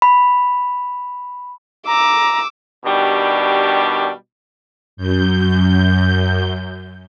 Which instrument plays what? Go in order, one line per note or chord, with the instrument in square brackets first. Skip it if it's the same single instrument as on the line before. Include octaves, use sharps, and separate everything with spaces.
[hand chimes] B5
[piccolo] A#5 [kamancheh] D6 E6
[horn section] B2 D#3 G3 D4 G4
[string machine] F#2 G6